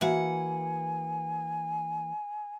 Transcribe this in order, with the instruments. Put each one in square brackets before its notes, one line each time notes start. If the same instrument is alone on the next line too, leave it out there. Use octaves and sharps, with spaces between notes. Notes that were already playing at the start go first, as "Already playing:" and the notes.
[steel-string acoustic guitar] E3 A#3 F#5 [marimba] F#4 E5 [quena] G#5